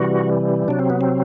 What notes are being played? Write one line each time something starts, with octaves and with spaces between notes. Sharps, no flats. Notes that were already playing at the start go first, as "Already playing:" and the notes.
Already playing: C3 E3 G3 F#4
C3 F#3 D4
C4
B3
C4